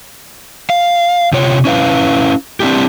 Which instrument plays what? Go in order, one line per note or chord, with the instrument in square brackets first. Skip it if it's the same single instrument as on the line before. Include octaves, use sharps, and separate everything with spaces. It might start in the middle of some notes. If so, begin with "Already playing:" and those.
[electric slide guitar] F5
C3 F4 C#5
C#4 E4 B4 F5
C4 D4 E4 G4